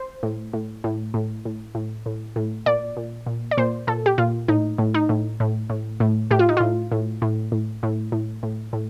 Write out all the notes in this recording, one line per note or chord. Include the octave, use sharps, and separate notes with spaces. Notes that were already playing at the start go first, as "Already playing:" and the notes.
Already playing: C5
A2
A2
A2
A2
A2
A2
A2
A2
A#2 D5
A#2
A#2
D5
A#2 C5
A#2 A4
G4
A#2 F4
A2 D#4
A2
D#4
A2
A2
A2
A2
A2 G4
F4
D#4
A2 F4
A2
A2
A2
A2
A2
A2
A2